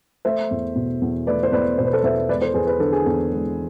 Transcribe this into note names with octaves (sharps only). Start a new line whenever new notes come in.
A3 C5 E5
E2
B2
E2
A3 B4 D5
C5
E2 B4 D5
B2 C5
B4
A4 C5
E2 C5 E5
G#3 B4 D5
A4 C5
E2 G#4 B4
B4
D3 A4
G#4
E2 A4
G#3